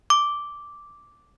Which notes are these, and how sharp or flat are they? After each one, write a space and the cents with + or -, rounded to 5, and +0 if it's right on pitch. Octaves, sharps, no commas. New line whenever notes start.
D6 -5